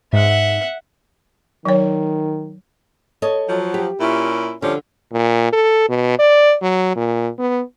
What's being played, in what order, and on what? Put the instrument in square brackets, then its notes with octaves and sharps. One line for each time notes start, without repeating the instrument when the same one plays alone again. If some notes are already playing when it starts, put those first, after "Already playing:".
[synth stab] G#2 [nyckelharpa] E5 F#5
[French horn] D#3 [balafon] F#3 C#5
[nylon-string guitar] A4 C#5 D#5
[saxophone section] F3 F#3
[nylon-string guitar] G4
[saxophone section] A#2 C#4 E4
[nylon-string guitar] D3 [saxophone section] F3 G3 C#4
[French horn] A#2
A4
B2
D5
F#3
A#2
B3